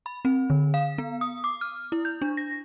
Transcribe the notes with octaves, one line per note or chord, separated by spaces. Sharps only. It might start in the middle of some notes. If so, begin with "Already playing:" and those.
B5
C4
D3
F5
B3
D#6
D6
F6
E4
G6
D4
A#6